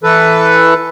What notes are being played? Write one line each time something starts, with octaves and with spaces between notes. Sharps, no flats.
E3 A4 B4